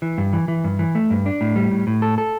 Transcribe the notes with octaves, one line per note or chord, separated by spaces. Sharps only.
E3
G2
E3
E3
G2
E3
A3
G2
D4
A2
G3
A2
A2
A4
A4